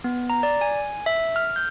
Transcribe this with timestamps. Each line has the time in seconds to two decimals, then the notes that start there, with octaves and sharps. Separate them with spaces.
0.04 B3
0.30 A#5
0.43 D5
0.61 G#5
1.06 E5
1.36 F6
1.56 G6